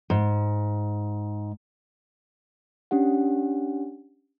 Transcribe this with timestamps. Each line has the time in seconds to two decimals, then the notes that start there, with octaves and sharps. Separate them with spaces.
0.10 G#2
2.91 C#4 D4 G4 F#5